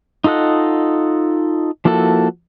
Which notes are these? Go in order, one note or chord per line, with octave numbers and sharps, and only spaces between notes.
D#4 F4 A4 D#5 F#5
F3 A#3 E4 F#4 A4